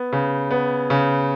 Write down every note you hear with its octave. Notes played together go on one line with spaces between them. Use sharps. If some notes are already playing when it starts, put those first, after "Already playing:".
Already playing: B3
C#3
B3
C#3